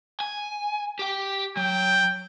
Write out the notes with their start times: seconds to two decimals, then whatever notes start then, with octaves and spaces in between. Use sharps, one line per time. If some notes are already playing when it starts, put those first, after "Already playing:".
0.20 G#5
0.99 G4 G5
1.57 F#3 G5